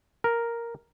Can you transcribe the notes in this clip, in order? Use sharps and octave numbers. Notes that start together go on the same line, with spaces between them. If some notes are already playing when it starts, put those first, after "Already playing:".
A#4